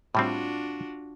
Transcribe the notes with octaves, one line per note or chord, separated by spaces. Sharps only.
A2 G3 C4 D4 F4 F#4